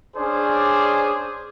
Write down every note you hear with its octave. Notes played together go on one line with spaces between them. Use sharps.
C#4 D4 G#4 C5 D5